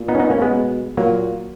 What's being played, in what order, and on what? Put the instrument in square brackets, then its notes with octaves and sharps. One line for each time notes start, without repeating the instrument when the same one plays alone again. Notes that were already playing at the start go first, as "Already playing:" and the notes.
Already playing: [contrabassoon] A#2
[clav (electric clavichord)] B3 D#4
C#4
B3 D#4
A#3 C#4
G#3 B3
[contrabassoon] B2
[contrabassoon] A#2 [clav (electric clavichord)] F#3 A#3